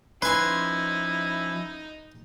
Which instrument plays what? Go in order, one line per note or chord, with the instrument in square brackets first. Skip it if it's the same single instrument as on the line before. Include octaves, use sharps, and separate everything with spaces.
[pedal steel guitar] F3 C#4 C6 [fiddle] D#4 [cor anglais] E4 [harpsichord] B4 G#5